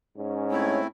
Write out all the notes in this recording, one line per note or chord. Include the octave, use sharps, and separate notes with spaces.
G#2 C#4
A3 C4 E4 C#5